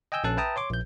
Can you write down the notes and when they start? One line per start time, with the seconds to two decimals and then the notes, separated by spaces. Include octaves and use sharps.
0.12 D#5 G5 G#5 E6 G6
0.24 A#1 C#4 A4 A5 F#6
0.37 B4 E5 G5 A5 A#5 D#6
0.56 C#5 C6 D6
0.70 A#1 G6